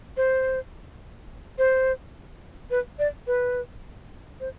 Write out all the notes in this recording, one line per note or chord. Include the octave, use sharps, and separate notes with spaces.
C5
C5
B4
D5
B4
C5